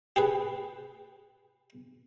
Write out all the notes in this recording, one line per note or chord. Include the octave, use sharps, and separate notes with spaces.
G4 G#4 B4